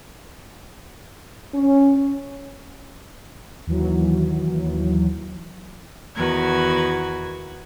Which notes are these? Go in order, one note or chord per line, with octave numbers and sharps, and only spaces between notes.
C#4
D#2 E3 F#3
E2 D#3 F#4 B4 G#6